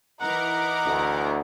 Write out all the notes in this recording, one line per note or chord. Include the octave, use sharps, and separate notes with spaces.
E3 D#4 A#4 F#5 D6
D2